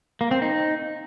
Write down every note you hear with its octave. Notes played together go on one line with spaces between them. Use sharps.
A#3
C4
D#4